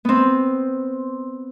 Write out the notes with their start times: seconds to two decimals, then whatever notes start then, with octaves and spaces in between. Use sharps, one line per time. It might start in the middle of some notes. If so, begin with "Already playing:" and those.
0.05 B3 C4